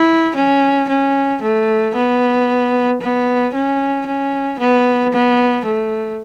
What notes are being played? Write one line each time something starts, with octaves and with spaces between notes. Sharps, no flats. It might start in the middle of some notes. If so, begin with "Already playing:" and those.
Already playing: E4
C#4
C#4
A3
B3
B3
C#4
C#4
B3
B3
A3